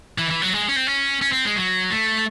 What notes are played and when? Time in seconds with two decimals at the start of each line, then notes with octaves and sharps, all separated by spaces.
0.18 E3
0.30 E3
0.42 F#3
0.53 G#3
0.69 C#4
0.76 C4
0.87 C#4
1.21 C#4
1.32 C4
1.45 G#3
1.56 F#3
1.90 A3